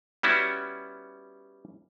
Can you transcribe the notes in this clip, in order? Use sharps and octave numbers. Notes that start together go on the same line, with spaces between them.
G3 B3 C#4 E4 F#4